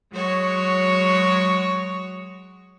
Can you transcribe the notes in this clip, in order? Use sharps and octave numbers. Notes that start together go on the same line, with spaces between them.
F#3 G#3 F#4 C#5